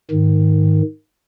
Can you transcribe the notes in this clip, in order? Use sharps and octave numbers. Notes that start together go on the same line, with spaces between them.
G#2 D#3